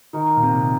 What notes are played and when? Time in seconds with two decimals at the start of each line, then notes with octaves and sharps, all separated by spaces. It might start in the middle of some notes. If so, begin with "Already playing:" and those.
0.13 D#3 D#4 A#4 C#5
0.37 A#2
0.43 C3